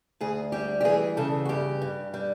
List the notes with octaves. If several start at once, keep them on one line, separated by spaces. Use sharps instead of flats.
D2 G#4
G3 G4
G4
E3 G#4
C#3 A4
F#4
G2 G4
G2
G3